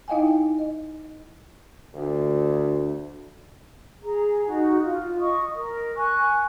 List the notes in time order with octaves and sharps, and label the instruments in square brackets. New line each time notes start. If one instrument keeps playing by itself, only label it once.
[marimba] D#4 E4 D#5 F5 G5 G#5
D#5
[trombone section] D2
[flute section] G#4 A#5
D#4 F#4
F4
D#5 C#6 D#6
A#4
G#5 C#6 F#6